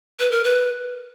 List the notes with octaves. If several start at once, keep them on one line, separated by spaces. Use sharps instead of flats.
B4
A#4
B4